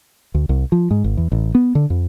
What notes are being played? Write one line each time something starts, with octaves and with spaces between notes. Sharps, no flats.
D2
C2
F3
G#2
G#1
E2
A1
B3
D3
F2